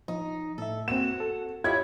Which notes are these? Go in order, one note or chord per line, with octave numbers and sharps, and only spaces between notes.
F3 D#4
A2 A4 E5
A#3 C4 F#4 E7
A4
E4 F4 G4 C#5 D#5 E5 G#6